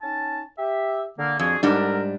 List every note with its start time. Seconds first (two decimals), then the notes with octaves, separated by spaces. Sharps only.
0.02 C#4 D#4 A5
0.58 G4 E5
1.18 D3 A#3
1.39 F2 D4 F#4 G#4
1.63 G#2 G3 D4 F#4 A4 A#4